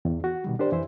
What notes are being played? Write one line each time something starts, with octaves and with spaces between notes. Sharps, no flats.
E2
F#4
B2 D#3 G3
D4 G4 A#4 C5 D5
F2 E3 E4 C5 E5